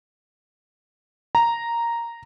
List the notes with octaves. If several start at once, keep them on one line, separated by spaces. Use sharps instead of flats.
A#5